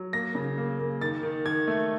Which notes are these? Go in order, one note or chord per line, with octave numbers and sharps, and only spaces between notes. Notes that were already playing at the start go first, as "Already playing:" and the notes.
Already playing: F#3
A#3 A#6
C#3
A#3
A#3
D#3 A6
D#3
D#3 G#6
A3